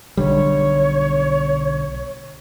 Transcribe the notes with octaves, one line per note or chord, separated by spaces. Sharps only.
B1 D3 G3 C#5